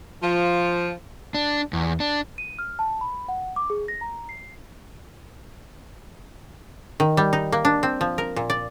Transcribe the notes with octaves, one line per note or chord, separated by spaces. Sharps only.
F3
D4
E2
D4
D#7
F6
A5
B5
F#5
D6
G#4
A#6
A#5
C7
D#3
G3
D#4
A#3
D4
C4
F3
A#4
A#2
D5